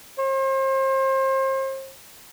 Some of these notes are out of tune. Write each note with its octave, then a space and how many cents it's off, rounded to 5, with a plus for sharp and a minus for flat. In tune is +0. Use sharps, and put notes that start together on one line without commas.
C5 +35